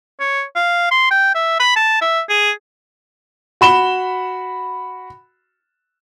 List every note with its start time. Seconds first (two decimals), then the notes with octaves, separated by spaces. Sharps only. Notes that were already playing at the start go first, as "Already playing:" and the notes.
0.20 C#5
0.56 F5
0.91 C6
1.11 G5
1.35 E5
1.60 B5
1.76 A5
2.01 E5
2.29 G#4
3.61 F#4 B5 E7 G7